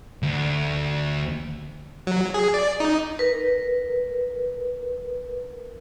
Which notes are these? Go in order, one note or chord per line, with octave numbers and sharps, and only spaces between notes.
D2
F#3
G#4
D5
D#4
A#4 B4